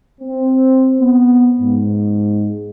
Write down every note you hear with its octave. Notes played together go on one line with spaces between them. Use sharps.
C4
B3
G#2